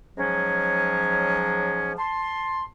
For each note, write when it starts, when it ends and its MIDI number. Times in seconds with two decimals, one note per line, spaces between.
0.17 1.93 44
0.17 1.93 53
0.17 1.93 54
0.17 1.93 56
0.17 1.93 61
1.98 2.63 81
1.98 2.63 84